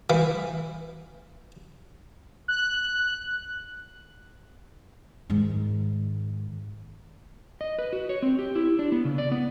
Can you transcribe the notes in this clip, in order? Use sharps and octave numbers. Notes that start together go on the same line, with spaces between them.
E3
F#6
G#2 D#3
D#5
B4
F#4
C#5
C4
G4
E4
D4
B3
C#3
D5
B3